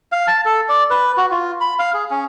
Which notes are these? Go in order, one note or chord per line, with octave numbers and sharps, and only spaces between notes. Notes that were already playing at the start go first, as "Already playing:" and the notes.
F5
A5
A4
D5
B4
F#4
F4
B5
F5
G#4
C#4